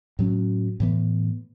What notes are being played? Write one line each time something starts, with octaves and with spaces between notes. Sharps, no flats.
A2 F#3 C#4
A2 E3 B3